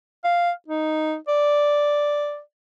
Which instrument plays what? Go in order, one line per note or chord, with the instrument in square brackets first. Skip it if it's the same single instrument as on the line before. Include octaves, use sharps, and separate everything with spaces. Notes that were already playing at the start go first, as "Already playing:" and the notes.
[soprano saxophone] F5
D#4
D5